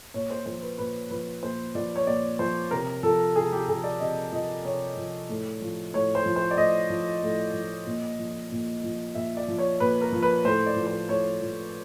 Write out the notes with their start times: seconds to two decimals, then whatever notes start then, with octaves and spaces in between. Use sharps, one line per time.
0.14 A#2 C#5
0.30 C5
0.46 F3 C5
0.62 B4
0.78 A#2 B4
1.10 F3 B4
1.43 A#2 C5
1.75 F3 D5
1.96 C#5
2.07 A#2 D5
2.39 F3 C5
2.71 C3 A#4
3.03 F3 A4
3.35 C3 G#4
3.52 G4
3.68 F3 G#4
3.84 D5
4.00 C3 D#5
4.32 F3 D#5
4.64 C3 C#5
4.97 F3
5.29 A2
5.62 F3
5.94 A2 C#5
6.15 C5
6.26 F3
6.36 C5
6.51 D5
6.58 A2 D#5
6.90 F3
7.23 A2
7.54 F3
7.87 A#2
8.19 F3
8.52 A#2
8.84 F3
9.15 A#2 E5
9.37 D5
9.48 F3
9.58 C#5
9.80 A#2 B4
10.01 A#4
10.12 F3
10.23 B4
10.44 A2 C5
10.66 D5
10.77 F3
10.87 C5
11.09 A2 C#5
11.42 F3